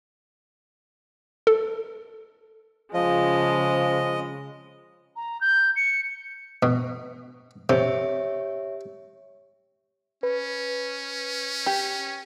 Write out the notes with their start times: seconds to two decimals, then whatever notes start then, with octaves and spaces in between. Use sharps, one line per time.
1.47 A4
2.93 C#3 F3 G#3 D#5
5.16 A#5
5.41 G6
5.76 C#7
6.63 B2
7.69 C3 G4 C#5 E5
10.23 C#4 B4
11.66 G4